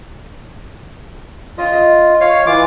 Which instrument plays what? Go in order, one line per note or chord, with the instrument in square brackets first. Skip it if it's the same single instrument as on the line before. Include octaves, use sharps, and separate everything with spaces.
[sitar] C#4 D#5 [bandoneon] F4
[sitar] D#5
[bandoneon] C#5 F5
E3 F4 D6